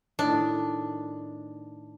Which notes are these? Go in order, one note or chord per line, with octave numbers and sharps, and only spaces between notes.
A2 D#3 D4